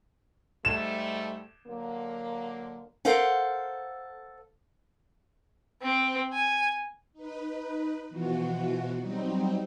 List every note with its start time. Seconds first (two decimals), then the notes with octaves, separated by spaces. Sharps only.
0.65 G#2 G3 A3 E7
1.67 D3 F#3 A#3
3.05 A4 A#4 C5 F5 F#5
5.82 C4
6.33 G#5
7.13 D#4 B4
8.09 B2 E3 F3 F#4
8.99 F#3 G3 C4 D#4